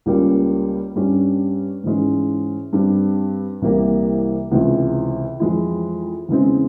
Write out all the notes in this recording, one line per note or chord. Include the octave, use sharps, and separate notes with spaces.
C#2 C#3 G3 A#3 C#4
G2 G3 C#4
G#2 E3 G#3 C#4
G2 G3 C4
C2 C3 E3 G3 A#3
C#2 C3 E3 G#3
F2 E3 G#3 E4
E2 C#3 E3 G#3 C4